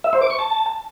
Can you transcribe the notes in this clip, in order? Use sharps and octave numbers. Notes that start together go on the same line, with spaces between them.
E5
C5
D6
C#6
A5